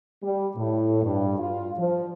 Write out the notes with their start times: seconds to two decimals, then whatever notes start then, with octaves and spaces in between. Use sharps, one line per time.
0.23 G3
0.56 A2
1.03 G2
1.39 F4
1.77 F3